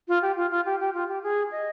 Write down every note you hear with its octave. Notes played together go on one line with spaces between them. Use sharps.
F4
G4
F4
F4
G4
G4
F4
G4
G#4
D#5